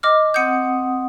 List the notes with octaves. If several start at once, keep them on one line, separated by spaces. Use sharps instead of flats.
D#5 D6 F6
C4 F#5 D#6 G6 C#7